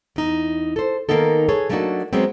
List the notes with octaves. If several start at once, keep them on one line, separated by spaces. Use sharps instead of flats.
E2 D#4
A4 C5
D#3 G#3 A#3 B3 D#4 A4
G#4 A4 B4 C#5
F#3 A3 A#3 D4 D#4 F#4
F#3 G#3 B3 C4